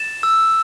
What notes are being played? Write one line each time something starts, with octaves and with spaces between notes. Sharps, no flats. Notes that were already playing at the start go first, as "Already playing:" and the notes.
Already playing: A6 E7
E6